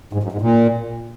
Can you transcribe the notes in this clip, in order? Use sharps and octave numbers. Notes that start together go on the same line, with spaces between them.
G#2
F#2
G#2
A#2